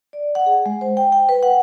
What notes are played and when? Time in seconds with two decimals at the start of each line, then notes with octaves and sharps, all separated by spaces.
0.13 D5
0.35 F#5
0.46 G#4
0.66 G#3
0.81 C5
0.97 G5
1.12 G5
1.29 B4
1.43 F#5